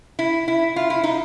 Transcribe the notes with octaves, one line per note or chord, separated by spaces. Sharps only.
E4
E4
F4
E4
D#4